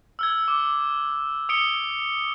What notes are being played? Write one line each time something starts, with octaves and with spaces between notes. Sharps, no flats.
E6 F6 G#6
D6
D#6 C#7 D7 G7